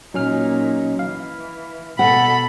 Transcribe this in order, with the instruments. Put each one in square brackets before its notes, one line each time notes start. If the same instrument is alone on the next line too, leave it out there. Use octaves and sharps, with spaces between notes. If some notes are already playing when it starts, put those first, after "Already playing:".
[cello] A#2 D#4 [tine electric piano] F#3 C#4 F6
[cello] E3 [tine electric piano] F5
[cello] B2 [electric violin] A4 B5 [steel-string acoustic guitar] F#5